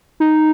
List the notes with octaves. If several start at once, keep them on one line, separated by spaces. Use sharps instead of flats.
D#4